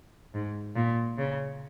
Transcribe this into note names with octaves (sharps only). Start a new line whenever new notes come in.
G#2
A#2
C#3